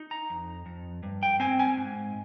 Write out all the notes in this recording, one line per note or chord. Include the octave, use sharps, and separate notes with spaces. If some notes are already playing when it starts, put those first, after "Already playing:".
Already playing: D#4
A#5
F2
F2
G2
G5
C4 G#5
G#5
G#2